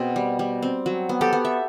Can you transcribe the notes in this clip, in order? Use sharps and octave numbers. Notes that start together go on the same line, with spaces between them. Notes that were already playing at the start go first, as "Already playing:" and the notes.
Already playing: B2 C4 G#4
G3
G3
C4
F#3
B3
G4 A4
B3
E5